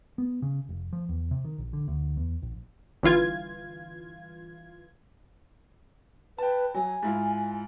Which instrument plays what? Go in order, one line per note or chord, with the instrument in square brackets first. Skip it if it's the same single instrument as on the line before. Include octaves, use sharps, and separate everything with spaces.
[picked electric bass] B3
C#3
F1
F3
E2
C3
D#3
A#1
D3
D2
E2
A#1
[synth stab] G1 E3 F4 G#6
[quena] B4 [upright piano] G5 A5
[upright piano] F#3 [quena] G#5
[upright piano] G#2 E4 F4